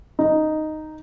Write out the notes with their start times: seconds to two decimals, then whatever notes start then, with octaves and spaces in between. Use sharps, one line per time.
0.19 D#4